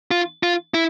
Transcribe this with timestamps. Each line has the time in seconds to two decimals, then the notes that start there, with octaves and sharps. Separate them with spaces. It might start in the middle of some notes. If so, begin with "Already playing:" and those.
0.11 F4
0.43 F4
0.74 E4